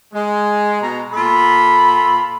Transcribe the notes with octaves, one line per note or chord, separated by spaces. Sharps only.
G#3
B2 A#5
A#2 F4 A4 B5